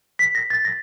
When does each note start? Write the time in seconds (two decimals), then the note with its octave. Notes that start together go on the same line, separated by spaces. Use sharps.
0.19 B6
0.35 A#6
0.50 A6
0.65 A#6